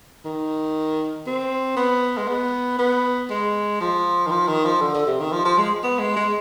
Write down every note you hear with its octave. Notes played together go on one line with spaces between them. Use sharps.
D#3
C4
B3
G#3
B3
B3
G#3
F3
D#3
F3
D#3
F3
D3
D3
C3
D#3
F3
F3
G#3
B3
G#3
G#3